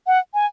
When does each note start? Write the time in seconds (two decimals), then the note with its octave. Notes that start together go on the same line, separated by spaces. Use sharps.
0.07 F#5
0.34 G#5